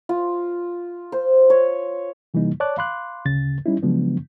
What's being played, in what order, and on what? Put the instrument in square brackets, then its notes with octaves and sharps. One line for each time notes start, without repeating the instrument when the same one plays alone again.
[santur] F4
C5
C#5
[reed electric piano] C3 E3 G3 A#3 D#4
C#5 D5 A5 D6 F#6
F5 B5 C6 D6 F#6
D2 C#3 A6
G3 C#4 D#4 E4
C#3 F3 F#3 G#3 B3 D4